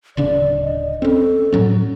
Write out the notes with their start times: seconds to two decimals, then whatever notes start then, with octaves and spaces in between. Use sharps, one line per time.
0.17 D1 C#3 D4 D5
0.62 D#5
1.02 C4 C#4 A4
1.52 A2 F#3 C#4